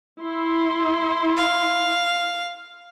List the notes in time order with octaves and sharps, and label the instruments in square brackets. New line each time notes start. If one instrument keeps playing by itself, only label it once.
[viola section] E4 C6
[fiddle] F5